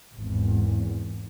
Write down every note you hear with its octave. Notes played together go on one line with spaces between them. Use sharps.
G#1 E2